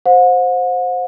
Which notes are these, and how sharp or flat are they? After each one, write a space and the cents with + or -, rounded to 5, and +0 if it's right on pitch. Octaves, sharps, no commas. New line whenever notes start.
C5 +0 F#5 -40